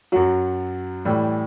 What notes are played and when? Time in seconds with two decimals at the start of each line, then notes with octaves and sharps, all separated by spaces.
0.12 F#2 F#3 F#4
1.05 A2 E3 G3